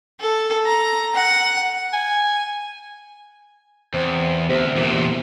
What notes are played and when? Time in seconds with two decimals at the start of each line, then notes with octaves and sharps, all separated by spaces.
0.20 A4
0.66 A#5
1.15 F#5
1.93 G#5
3.94 E2 C4
4.50 D2 C3
4.76 E2 A#2